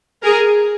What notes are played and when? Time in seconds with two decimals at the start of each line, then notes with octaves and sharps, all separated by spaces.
0.24 G#4 A#4